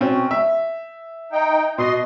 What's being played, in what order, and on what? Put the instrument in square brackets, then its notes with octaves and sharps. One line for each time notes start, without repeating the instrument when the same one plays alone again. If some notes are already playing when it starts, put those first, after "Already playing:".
[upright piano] B2 C4 C#4
E5
[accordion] D#4 G5
[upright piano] B2 [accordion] D#5 C6